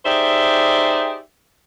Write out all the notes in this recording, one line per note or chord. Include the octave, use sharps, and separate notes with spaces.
D#4 G4 G#4 C5 D5 E5